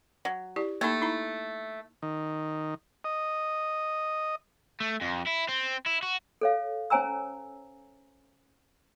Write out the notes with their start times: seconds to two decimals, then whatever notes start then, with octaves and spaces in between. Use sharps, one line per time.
0.25 F#3
0.56 E4 G4 D5
0.81 A3 A#3 D#4 A4
1.01 D#4 E4 A#5
2.02 D#3
3.04 D#5
4.80 A3
5.01 F2
5.27 E4
5.49 C4
5.86 E4
6.03 F#4
6.41 A4 C#5 F5
6.90 C#4 C5 C#5 G#5 A#5 E6